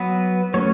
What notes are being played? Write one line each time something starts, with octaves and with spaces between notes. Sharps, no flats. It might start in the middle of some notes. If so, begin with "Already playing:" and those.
Already playing: F#3 B3 B4
F#3 A3 C#4 C#5